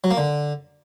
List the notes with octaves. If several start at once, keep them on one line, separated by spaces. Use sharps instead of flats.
F#3
A#3
D3